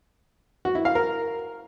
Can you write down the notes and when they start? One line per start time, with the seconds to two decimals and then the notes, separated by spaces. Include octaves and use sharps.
0.65 F#4
0.75 E4
0.85 F5
0.95 A#4